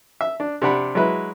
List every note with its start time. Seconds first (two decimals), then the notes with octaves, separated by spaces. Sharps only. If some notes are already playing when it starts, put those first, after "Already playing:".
0.21 E5
0.40 D4
0.62 C3 D4 F#5 B5
0.95 F#3 G#3 E4 B4